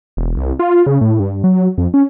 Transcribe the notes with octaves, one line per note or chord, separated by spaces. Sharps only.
E1
C2
F4
C#3
A2
G2
F#3
F2
C#4